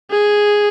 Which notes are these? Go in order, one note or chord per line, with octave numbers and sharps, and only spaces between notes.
G#4